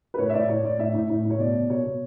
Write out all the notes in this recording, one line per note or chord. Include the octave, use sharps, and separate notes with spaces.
B4
A2 C#5
E5
A2 D5
A2 C#5
A2 D5
A2 E5
A2
A2
A2
C#5
B2 D5
B2
B2 C#5
B2